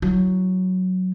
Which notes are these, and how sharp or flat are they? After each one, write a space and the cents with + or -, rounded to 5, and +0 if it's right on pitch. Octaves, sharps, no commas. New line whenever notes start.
F#3 +0 E4 +0